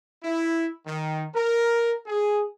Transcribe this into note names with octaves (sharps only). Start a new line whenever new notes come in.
E4
D#3
A#4
G#4